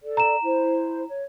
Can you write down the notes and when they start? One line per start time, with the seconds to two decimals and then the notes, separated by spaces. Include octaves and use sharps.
0.02 A4 D5
0.17 A#5 E7
0.42 E4 C5
1.09 C#5